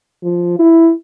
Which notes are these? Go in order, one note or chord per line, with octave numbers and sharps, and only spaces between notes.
F3
E4